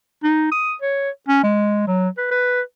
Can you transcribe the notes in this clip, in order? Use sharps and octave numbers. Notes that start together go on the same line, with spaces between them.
D#4
D#6
C#5
C#4
G#3
F#3
B4
B4